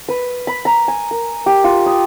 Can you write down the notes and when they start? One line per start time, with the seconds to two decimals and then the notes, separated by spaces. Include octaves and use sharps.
0.09 B4
0.47 B5
0.65 A#5
0.88 G#5
1.11 A#4
1.46 G4
1.64 F4
1.86 D#6